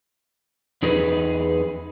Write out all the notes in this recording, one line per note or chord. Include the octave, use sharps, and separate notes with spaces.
E2 D#4 G#4 B4